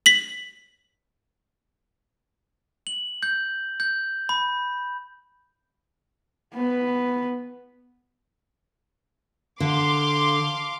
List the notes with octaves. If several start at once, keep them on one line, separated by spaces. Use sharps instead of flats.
B6 F#7
F#7
G6
G6
B5
B3 B4
D3 F5 C6 D6